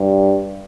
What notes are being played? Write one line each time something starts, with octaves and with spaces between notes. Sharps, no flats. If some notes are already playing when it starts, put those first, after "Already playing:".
Already playing: G2